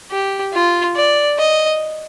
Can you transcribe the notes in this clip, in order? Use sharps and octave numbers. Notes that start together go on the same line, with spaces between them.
G4
F4
D5
D#5